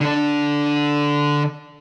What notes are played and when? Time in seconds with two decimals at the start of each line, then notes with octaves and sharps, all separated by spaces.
0.01 D3 D4